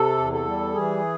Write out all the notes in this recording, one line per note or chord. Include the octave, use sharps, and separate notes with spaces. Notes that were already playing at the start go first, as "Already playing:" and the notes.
Already playing: C3 A4
E2
A4
G3
E3 G#4